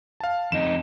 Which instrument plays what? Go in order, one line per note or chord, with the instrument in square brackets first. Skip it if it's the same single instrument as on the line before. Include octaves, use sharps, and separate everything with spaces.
[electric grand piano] F5 A5
[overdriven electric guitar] F2 D#4 [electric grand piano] E7